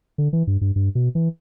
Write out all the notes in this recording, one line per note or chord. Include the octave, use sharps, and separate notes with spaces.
D3
E3
G2
G2
G2
B2
E3